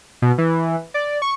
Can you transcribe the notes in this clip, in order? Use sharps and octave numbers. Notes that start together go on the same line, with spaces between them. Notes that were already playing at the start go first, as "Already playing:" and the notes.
B2
E3
D5
C#6